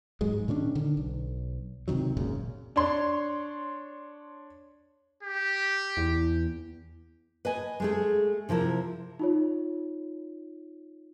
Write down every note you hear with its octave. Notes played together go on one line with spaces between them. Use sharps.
G#2 F#3 G#3
A#2 D#3 C#4 D4
D3 D#3
B1
C#2 C3 D#3 F#3
G#1 F#2 A#2 C#3
D4 C#5 C6
G4
E2
B4 D#5 G#5
G#3 A3 G#4
C3 F3 E4 A#4
D#4 F4 C#5